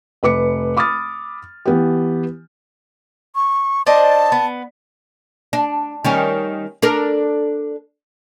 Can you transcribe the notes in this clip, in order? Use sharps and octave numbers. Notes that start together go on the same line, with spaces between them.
F1 B4 D6 C#7
B5 D6 D#6 F6 A6
E3 B3 G4
C#6
D4 C5 D#5 A5
B3
D4
D#3 G3 C#4
D4 A4 A#4